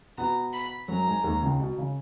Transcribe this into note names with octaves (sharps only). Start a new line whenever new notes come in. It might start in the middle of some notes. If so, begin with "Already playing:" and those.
B2 B3 A#5
B5
F#2 F#3 A#5
G#2 G#3
D#2 D#3
C#2 C#3
B2
C#3